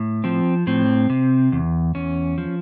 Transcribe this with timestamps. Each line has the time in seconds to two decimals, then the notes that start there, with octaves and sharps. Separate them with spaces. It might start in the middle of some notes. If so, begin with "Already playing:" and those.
Already playing: A2
0.24 F3 C4
0.67 A2 C4
1.10 C3
1.52 E2
1.95 E2 C#4
2.38 F3